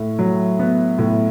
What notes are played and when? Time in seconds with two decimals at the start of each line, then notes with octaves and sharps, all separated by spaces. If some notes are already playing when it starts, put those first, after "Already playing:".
Already playing: A2
0.19 F#3
0.59 B3
0.99 A2